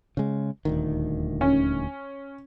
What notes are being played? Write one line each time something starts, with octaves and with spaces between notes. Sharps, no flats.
C#3 G#3
D#1 D2 D#3
C#4